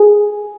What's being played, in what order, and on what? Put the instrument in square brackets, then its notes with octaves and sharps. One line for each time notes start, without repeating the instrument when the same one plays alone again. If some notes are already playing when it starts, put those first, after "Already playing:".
Already playing: [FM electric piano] G#4